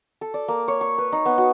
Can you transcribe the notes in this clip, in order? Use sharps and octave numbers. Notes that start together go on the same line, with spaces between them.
A4
D5
A#3
C#5
C#6
B4
D#4
B3
F#4